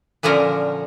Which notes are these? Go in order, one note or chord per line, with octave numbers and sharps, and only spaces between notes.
A#2 D3 F3 C#4 A#4